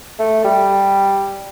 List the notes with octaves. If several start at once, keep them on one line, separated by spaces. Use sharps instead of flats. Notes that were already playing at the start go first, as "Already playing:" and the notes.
A3
G3